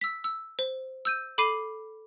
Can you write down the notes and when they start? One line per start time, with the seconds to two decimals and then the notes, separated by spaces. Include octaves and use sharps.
0.01 E6 B6
0.24 E6
0.59 C5
1.05 E6 G6 D#7
1.38 A4 B5 D6 C7 D#7 F#7